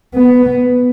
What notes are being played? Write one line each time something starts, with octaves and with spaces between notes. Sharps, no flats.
B3